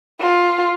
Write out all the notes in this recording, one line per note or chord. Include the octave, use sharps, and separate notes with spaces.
F4